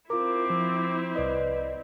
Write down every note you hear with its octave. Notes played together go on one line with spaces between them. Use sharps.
C4 E4 F4 A#4 D6
F3
C2 B4 D5 D#5